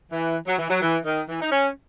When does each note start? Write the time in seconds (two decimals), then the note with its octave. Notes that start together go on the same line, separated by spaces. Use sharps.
0.12 E3
0.48 F#3
0.59 E3
0.70 F#3
0.82 E3
1.05 D#3
1.29 E3
1.42 D#4
1.52 C#4